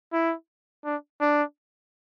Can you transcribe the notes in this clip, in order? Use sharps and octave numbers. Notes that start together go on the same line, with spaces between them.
E4
D4
D4